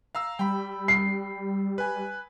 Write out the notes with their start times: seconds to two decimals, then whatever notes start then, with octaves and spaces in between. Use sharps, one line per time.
0.15 F5 A#5 E6
0.39 G3 G5 B5
0.88 C7
1.78 B4 G#5